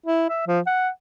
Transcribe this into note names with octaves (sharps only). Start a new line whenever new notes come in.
E4
E5
F3
F#5